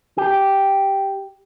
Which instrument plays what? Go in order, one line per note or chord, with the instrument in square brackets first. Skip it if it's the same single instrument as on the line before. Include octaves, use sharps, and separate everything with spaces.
[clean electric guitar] G4